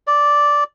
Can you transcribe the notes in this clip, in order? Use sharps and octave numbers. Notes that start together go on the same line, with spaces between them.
D5